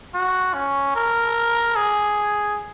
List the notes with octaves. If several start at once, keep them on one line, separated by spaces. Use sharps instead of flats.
F#4
C#4
A#4
G#4